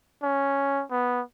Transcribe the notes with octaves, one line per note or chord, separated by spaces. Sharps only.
C#4
B3